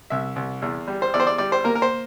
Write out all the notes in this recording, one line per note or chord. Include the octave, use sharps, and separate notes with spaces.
C2 E5
C2
E2
G3
C5
E2 D5
C5
D5
G3 D5
C5
A#3 A#4
A#4
C5